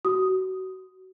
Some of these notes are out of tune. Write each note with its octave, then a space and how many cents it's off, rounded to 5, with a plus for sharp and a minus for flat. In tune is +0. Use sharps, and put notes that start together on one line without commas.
F#4 +25 D#6 +0